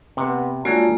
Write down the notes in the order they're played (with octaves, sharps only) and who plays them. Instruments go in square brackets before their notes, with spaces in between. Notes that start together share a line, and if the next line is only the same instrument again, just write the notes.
[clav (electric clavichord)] C3 F#5 [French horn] B3
[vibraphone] G#3 A#3 F4 [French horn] D4 [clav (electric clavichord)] F#4 A4 C#5